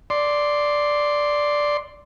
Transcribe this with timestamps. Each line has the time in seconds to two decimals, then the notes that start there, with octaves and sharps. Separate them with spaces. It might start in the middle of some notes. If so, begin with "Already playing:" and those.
0.10 D5 C6